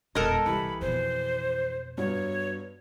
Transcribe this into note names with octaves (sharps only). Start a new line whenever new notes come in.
E1 A#2 A4 A#4 D#5 F#6 G#6 A6
C2 E3 G4 B5 C#7
F2 B2 C5
G2 F#3 B3 C#5